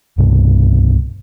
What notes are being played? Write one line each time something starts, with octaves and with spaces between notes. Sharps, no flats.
C2 G2 B2